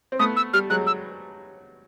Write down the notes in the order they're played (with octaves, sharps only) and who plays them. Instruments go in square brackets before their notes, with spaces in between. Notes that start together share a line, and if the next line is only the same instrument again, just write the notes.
[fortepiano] C4
[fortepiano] A3 B3 [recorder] D#6
[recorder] E6
[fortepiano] G3 [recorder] F6
[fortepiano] F#3 G#3 [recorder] F#6
[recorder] E6